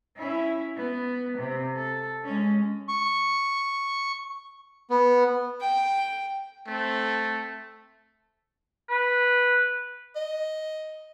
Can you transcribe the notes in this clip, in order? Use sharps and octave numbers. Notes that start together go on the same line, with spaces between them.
C#4 E4
B3
C3
A4
G#3 C#4
C#6
B3
G5
A3 C4 A4
B4
D#5